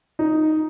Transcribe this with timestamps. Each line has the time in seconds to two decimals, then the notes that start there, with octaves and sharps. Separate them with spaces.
0.19 D#4